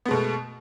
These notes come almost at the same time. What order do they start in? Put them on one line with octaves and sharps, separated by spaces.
B3 G#3 B2 A3